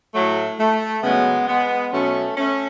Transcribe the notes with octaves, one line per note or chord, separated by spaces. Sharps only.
A2 F#3 A3
A3
C#3 F#3 G#3 B3
G#3 B3
B2 F#3 A3 C#4
A3 C#4